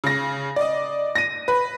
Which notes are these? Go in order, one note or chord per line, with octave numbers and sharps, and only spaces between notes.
C#3 A#6
D5 D#5
A#6 D#7
B4